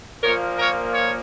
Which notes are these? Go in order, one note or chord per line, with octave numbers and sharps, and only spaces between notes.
A#2 F3 A#3 A#4 C#5
A#4 C#5
C#5